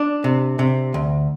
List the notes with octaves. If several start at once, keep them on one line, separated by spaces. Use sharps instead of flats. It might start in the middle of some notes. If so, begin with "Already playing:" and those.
Already playing: D4
C3
C3
D2